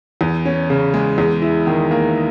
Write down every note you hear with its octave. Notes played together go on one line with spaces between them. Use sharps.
E2
C#4
C#3
G#3
E2
E4
D#3
A#3